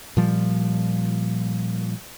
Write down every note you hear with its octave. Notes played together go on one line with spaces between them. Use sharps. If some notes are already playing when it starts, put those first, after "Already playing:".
A#2 F3 G3